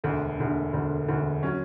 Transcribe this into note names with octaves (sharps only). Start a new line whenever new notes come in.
E1 D2 D3
E1 D2 D3
E1 D2 D3
E1 D2 D3
F#3 C#4